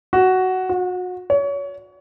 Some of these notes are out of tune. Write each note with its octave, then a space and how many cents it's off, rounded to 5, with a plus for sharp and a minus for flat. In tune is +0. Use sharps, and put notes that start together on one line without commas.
F#4 +10
F#4 -30
C#5 +30